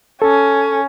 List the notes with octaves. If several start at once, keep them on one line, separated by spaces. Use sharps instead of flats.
C#4 A4